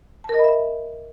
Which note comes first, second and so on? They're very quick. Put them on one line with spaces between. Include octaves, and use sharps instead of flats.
A5 A#4 D#5 B5 E5